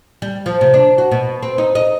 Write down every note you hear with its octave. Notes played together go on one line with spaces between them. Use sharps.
G3
F3
C3
D4
F#4
B2
C4
D#4
D#5